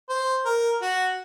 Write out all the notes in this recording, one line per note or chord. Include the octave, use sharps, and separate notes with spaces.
C5
A#4
F#4